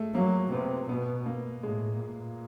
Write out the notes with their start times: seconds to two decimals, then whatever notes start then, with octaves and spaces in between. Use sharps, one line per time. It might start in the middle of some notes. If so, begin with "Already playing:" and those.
Already playing: G#3 A3
0.15 F#3 A#3
0.52 C3 B3
0.89 B2 B3
1.26 A#3
1.62 A2 G#3
2.00 A#2